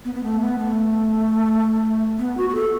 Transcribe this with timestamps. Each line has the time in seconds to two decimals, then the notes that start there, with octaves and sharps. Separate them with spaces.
0.05 B3
0.15 B3
0.23 A3
0.40 B3
0.59 A3
2.19 B3
2.37 F#4
2.50 F#4
2.55 A4